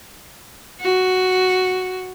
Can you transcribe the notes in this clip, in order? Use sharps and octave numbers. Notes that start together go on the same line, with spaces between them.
F#4